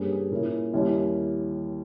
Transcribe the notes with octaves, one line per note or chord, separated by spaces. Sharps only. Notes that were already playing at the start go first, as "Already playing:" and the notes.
Already playing: G2 G3 A#3 C#4 G#4
G#4
A#2 A#3 C#4 E4
D#2 D#3 G3 C#4 E4